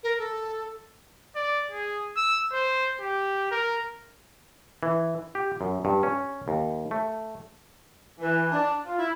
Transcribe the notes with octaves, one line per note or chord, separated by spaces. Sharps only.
A#4
A4
D5
G#4
E6
C5
G4
A#4
E3
G4
F#2
G2
C#4
D#2
A3
E3
D4
F4
E4